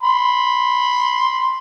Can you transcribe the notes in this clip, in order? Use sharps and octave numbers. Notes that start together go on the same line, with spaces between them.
B5 C6